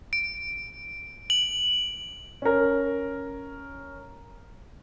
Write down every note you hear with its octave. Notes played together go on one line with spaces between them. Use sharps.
D7
F#7
C#4 A#4